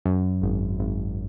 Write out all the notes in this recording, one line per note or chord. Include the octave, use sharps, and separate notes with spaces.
F#2
G#1
G#1